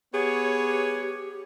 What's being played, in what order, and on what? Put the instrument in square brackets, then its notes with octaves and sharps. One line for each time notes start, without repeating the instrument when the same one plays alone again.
[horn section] B3 C#5 [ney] G4 [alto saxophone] G#4